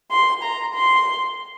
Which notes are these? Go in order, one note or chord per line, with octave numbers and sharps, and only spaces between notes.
C6
A#5
C6